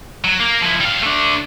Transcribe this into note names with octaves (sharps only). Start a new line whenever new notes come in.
F#3
A#3
F3 E4
G3 F5
A3 D4